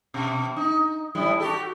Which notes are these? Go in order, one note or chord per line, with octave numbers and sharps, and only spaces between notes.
B2
D#4
A2 G3 E4
F#4 G4 A4